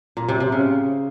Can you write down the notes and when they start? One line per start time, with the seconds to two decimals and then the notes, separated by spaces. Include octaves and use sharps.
0.17 A#2
0.29 C3
0.40 C3
0.52 C#3